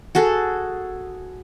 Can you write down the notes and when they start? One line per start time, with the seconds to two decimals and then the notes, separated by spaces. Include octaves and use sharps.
0.15 F#4 G#4 A4